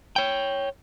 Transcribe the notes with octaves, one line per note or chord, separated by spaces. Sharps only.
C#5 G5